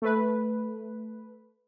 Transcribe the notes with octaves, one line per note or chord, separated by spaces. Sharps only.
A3 B4